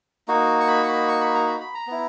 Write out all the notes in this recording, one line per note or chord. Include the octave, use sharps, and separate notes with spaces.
A#3 D#4 F#4
C#6
B5
C#6
B5
C#6
B5
A#5
B5
B5
A#5
B3 E4